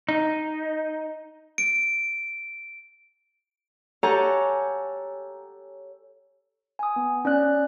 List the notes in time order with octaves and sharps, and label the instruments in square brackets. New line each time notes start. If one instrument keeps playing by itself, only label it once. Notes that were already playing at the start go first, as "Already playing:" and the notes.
[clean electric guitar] D#4
[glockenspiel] D7
[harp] G4 A4 C#5 F#5 G#5 A#5
[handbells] G#5 D#6
B3
C#4 D5 F#6